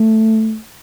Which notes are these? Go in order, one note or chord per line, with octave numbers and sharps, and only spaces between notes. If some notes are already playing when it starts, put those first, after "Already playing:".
Already playing: A3